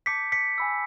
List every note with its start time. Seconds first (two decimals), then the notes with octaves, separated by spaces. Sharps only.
0.06 A5 D6 G6 B6 C#7
0.32 B6 C#7
0.58 G#5 B5 E6